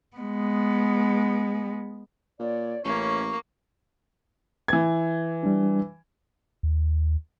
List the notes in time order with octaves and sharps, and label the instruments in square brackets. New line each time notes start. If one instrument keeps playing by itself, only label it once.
[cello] G#3 B3
[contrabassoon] A#2 [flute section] C#5 D5
[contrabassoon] A1 [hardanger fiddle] A#3 [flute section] C#4 B4 [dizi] C#6
[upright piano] E3 G#6
[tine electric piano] G3 D4
[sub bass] D#2